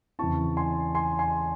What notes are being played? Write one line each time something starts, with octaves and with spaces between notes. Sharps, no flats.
E2 C#3 E3 C4 E4 A5 C#6
G#5 C6
G#5 C6
G#5 C6